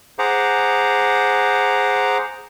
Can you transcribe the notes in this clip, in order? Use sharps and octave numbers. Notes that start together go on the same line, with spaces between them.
G#4 C5 F#5 A#5 D6